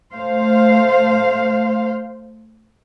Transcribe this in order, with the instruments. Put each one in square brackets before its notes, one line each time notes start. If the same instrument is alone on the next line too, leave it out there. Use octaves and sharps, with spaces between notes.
[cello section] A3 C5 F5